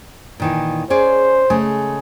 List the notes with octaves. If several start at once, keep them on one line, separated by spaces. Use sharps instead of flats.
A#2 D#3 E3
C#4 G#4 C5 D5
C#3 G#3 A3